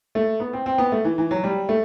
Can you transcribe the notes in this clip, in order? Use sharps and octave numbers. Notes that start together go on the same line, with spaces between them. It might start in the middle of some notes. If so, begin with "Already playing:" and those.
A3
B3
C4
C4
B3
A3
E3
E3
F#3
G3
A3